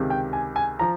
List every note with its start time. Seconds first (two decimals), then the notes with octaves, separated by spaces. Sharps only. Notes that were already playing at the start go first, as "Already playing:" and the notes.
Already playing: C#2 C3 D#3
0.10 G5
0.33 G#5
0.56 G#5
0.79 F3 A#5